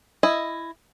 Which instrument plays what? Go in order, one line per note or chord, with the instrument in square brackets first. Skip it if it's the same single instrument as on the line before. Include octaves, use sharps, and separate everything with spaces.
[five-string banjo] E4 D#5